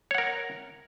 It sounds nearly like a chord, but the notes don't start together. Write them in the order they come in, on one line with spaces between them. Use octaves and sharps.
C#5 F#5 A#4